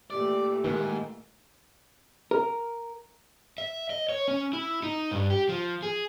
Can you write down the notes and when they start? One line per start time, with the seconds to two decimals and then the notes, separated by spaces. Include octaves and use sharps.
0.10 A#2 E3 A3 G4 D5
0.64 G#2 D#3 A#3
2.31 A#4
3.58 E5
3.90 D#5
4.09 C#5
4.28 C#4
4.53 E4
4.83 D#4
5.11 G2
5.30 G4
5.49 F3
5.83 G#4